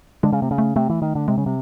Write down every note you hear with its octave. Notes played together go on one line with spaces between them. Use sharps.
D3 G#3
C#3
C3 A3
C#3
A3
C3 A3
E3
D#3
D3
C3 G#3
C#3
C3 G3